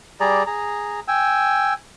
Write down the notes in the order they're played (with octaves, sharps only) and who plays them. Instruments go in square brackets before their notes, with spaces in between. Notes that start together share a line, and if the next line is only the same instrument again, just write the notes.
[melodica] G3 G#4 D5 A#5
G#4 A#5
G5 G#5 E6